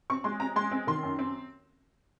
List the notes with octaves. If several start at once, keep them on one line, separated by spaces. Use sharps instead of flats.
C4 C#6
G#3 C6
C4 A#5
G#3 C6
C4
D#3 C6
F#2
C4